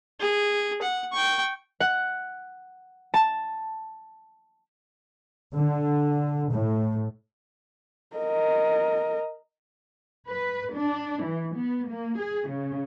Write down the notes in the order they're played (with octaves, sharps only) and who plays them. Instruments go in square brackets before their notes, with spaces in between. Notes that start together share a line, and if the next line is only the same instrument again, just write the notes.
[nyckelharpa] G#4
F#5
G5 C#6
[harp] F#5
A5
[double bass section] D3
A2
[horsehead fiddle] A#4 D#5
[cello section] B4
D4
E3
B3
A#3
G#4
C#3